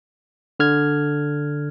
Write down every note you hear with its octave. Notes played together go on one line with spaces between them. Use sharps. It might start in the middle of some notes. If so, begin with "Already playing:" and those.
D3 F6 G#6